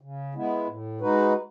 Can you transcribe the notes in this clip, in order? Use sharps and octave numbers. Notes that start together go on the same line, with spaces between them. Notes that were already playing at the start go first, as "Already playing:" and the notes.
C#3
G#3 B3 E4
A2
G#3 D#4 F#4 B4